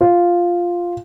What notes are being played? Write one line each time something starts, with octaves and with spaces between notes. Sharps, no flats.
F4